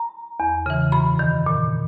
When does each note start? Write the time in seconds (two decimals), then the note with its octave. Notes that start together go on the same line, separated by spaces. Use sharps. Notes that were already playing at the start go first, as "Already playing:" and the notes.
Already playing: A#5
0.40 E2
0.66 C#3 E3
0.92 F#2 B5
1.19 D#3
1.46 A#2